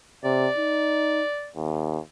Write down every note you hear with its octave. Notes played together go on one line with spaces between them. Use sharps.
C3 D5
D#4
D#2